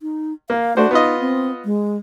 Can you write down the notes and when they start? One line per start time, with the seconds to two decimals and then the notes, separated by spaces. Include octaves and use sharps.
0.02 D#4
0.50 A#3 F5
0.77 A3 D4 F#4 C5
0.91 B3 D#4 F4 D#5
1.20 C4
1.65 G#3